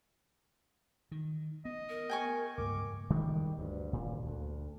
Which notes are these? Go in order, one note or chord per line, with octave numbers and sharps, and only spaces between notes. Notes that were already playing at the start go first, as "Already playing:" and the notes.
D#3
B3 D#5
A#4
G5 G#5 C#6
C#2 G2 A#3 D6
D#3 G3 G#3
D2 G2
D#1 A#2
D2